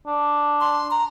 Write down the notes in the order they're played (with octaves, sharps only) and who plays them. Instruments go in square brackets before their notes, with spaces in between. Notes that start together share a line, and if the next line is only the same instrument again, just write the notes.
[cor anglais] D4
[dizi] C6
A#5